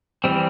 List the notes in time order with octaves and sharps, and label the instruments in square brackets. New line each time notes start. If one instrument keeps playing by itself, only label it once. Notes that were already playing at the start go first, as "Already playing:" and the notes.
[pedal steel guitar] E3 G3 C4